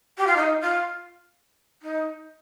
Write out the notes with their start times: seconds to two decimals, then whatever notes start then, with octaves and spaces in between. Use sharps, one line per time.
0.17 G4
0.26 F4
0.36 D#4
0.61 F4
1.82 D#4